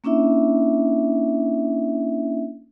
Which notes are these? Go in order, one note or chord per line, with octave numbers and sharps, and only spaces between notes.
A#3 C#4 D4 E4 E5